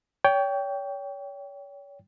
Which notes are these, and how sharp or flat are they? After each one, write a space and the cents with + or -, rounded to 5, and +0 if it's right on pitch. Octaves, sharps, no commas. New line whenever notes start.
C#5 +35 G5 +0